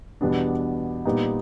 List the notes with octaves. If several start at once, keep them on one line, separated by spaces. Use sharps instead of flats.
E2 B2 G3 B3 D4
A#2 G3 B3 D#4